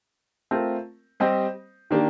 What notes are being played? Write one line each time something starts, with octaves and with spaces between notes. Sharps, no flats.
A3 C4 F4 A#4
G3 C4 G4 C5 D#5
D#3 A#3 D4 G4